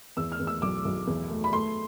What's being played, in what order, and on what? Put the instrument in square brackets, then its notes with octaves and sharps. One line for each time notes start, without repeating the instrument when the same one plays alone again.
[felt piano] E2 E6
F6
E2
E6
B1 D6
B1
E2
A3
B5
A3 C6